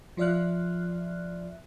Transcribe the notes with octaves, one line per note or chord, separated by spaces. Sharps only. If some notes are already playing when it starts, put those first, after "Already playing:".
F3 F4 D5 E5 F6 F#6